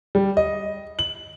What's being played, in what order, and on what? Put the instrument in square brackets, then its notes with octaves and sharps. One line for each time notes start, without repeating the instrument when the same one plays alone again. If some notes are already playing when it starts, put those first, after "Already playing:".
[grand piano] G3
D#5
F#7